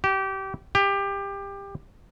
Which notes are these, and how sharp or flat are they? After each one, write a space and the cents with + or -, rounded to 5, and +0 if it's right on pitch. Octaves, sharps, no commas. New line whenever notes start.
G4 -25
G4 +20